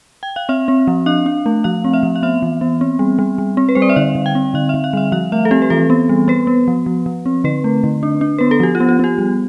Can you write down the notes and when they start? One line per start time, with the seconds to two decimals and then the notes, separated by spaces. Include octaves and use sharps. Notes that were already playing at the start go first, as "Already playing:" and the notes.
0.23 G5
0.36 F5
0.49 C4 E5
0.68 C4
0.88 F3
1.06 D4 F5
1.26 D4
1.46 A3
1.64 F3 F5
1.84 C4
1.94 E5
2.03 F3
2.16 F5
2.23 B3 E5
2.42 E3
2.61 B3
2.81 C4
2.99 G3
3.19 G3
3.38 G3
3.57 C4
3.69 B4
3.75 G3 C5
3.82 D5
3.89 E5
3.96 D3 F5
4.15 D3
4.26 G5
4.35 C4
4.54 D3 F5
4.69 D3 E5
4.84 F5
4.93 G3 E5
5.12 F3 F5
5.32 A3 E5
5.45 A4
5.51 C4 G4
5.62 B4
5.70 E3 A4
5.90 B3
6.09 G3
6.28 B3 B4
6.47 B3
6.68 F3
6.86 F3
7.06 F3
7.26 C4
7.44 D3 B4
7.64 A3
7.84 D3
8.03 D4
8.21 D4
8.39 B3 B4
8.51 A4
8.60 F3 G4
8.75 F4
8.80 B3
8.89 F4
8.99 B3 G4
9.18 G3